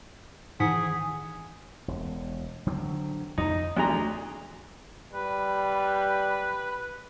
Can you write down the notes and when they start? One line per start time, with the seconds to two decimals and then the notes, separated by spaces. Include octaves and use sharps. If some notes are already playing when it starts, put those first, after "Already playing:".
0.60 G#2 D#3 E3 G#4 F#5 B6
1.88 E1
2.67 D3 F#3 C4
3.38 F2 D#4
3.77 D2 E3 F#3 G#4 A#5
5.13 G3 B4